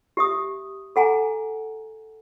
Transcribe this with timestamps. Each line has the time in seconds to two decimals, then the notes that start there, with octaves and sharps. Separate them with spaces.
0.17 G4 E5 D#6
0.96 A4 F#5 G#5 A#5